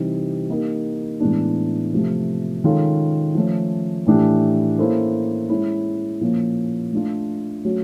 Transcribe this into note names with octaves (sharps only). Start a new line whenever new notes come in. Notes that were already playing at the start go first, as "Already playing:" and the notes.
Already playing: C3 E3 G3 C4 D#4
A#3 D#4 G4 A#4
A2 E3 G#3 B3 D4
C3 F3 A3
D#3 G#3 C#4 F4 A4
F3 A3 C#4
A2 E3 A3 D4 G4
A#3 C#4 E4 A4 C5
G#3 C#4 E4
A#2 F3 A#3 C#4
A3 D4 F4
F#3 A3 C#4 F#4